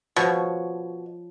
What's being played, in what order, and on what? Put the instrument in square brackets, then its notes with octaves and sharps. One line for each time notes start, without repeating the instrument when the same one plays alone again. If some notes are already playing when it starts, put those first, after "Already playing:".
[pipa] B2 [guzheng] F3 C#5